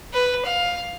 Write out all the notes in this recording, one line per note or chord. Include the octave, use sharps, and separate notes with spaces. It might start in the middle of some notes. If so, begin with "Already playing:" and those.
B4
F5